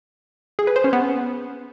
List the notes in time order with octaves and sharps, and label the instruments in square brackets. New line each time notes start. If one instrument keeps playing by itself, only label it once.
[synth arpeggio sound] G#4
B4
C5
C#4
B3